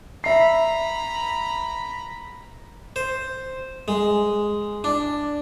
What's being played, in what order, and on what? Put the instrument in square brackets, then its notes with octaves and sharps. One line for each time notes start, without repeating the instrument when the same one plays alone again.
[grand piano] E5 C7 [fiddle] A#5 B5
[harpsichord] C5
G#3
D4